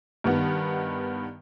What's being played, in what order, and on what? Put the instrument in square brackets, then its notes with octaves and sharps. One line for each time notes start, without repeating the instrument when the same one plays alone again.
[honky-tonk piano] G2 D#3 B3